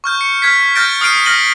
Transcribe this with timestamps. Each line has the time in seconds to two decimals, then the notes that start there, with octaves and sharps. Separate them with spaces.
0.04 C#6 F6 G6
0.21 C#7
0.42 F6 G#6 B6
0.75 F6 G6 A6 A#6 D7
1.01 D#6 F6 C7 D7 D#7
1.25 F6 A#6 D#7 F#7 G7